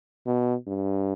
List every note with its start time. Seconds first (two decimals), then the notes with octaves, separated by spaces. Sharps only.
0.26 B2
0.67 G2